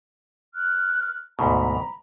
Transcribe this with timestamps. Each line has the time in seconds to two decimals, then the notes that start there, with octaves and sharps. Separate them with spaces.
0.54 F6 F#6
1.39 D2 G#2 B2 A#5 B5